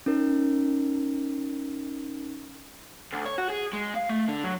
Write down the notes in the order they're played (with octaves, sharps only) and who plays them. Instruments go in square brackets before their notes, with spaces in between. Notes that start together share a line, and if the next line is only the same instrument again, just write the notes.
[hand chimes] C#4 D#4 A#4
[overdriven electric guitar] D2
C#5
F#4
G#4
G#3
F5
A3
D3
F#3